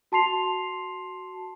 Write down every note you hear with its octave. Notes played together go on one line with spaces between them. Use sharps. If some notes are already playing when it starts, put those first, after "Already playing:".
F#4 A5 C6 C7 F7